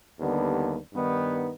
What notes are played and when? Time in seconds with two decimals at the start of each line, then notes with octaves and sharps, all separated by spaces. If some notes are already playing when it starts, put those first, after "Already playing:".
0.19 D#2 D3 G3 B3 D4
0.93 G2 D#3 G3 B3 D#4